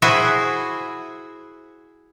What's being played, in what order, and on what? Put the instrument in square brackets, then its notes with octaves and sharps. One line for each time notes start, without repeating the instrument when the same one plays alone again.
[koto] E4 F#4 G#4 C5 E5